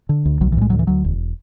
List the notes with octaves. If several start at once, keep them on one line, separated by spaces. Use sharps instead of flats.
D3
D2
B1 F#3
E3
A2 G#3
D2 F#3
E3
D2 F#3
E1